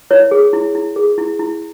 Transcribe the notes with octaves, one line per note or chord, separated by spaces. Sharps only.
E4 C#5
G#4
E4
E4
G#4
E4
E4